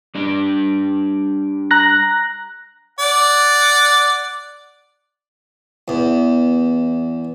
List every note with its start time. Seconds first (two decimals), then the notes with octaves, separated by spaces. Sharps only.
0.15 G3 D4 D5
1.71 A#5 F#6 A#6
2.99 D5 F#5
5.88 E2